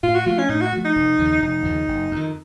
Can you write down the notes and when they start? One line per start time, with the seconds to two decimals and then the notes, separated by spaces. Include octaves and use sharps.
0.03 A2 F4
0.15 F#4
0.26 F3 A3 F4
0.38 C#4
0.49 A2 D#4
0.61 F#4
0.73 F3 A3
0.85 D#4
0.96 F1
1.19 D#2 C#3 F3
1.42 F1 D#4
1.65 D#2 C#3 F3
1.88 F#1
2.11 F2 D#3